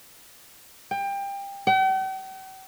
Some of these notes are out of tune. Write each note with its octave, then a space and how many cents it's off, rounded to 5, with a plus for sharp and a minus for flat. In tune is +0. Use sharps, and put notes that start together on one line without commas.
G5 +25
G5 -45